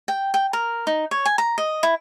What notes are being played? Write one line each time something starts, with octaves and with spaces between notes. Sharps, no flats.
G5
G5
A#4
D#4
C#5
G#5
A#5
D#5
E4